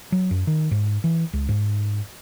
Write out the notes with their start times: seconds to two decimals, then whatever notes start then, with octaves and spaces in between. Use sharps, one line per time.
0.12 F#3
0.31 F#2
0.47 D#3
0.71 G#2
1.04 E3
1.33 C#2
1.49 G#2